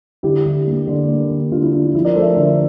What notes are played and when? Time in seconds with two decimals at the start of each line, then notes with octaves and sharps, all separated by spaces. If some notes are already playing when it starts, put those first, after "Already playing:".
0.23 D3 E4 G4
0.45 D3
0.67 A#3
0.87 D3
1.09 A#3
1.31 D3
1.51 D3 D4 F4
1.62 E4
1.73 D3 E4
1.83 E4
1.95 F3 E4
2.05 A#4 D5
2.16 A3 A4 C5
2.22 E5
2.26 A#4 D5
2.37 D3